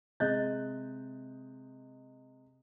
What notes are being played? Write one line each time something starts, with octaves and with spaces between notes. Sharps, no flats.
C3 G#3 D#5 F#6 G6 A6